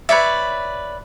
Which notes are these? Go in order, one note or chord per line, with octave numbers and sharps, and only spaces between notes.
B4 C#5 D5 E5